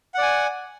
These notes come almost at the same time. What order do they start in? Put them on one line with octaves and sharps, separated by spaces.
F#5 D5 G#5